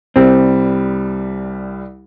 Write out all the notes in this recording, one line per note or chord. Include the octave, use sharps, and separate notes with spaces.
C2 G3 C4